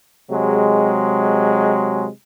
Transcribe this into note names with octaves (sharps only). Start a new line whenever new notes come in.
C3 F#3 G#3